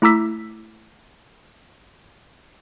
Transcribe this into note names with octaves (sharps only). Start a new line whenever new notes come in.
A3 E4 A#5 D6 E6 B6